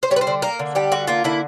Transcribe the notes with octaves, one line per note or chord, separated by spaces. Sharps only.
C5
G3 C#5
B4
C5
D3
A#3 A#4
D3
G3 G4
D3 F#4
A#3 F4
D3 E4